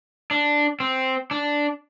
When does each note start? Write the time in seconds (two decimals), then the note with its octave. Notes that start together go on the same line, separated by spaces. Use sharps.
0.31 D4
0.80 C4
1.31 D4